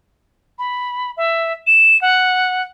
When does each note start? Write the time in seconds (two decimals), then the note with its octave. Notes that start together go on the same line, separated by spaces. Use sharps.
0.59 B5
1.17 E5
1.67 E7
2.02 F#5